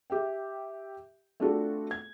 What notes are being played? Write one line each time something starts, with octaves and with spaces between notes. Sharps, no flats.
G4 E5 G5
A3 C4 D4 F4 F#4 A4
G#6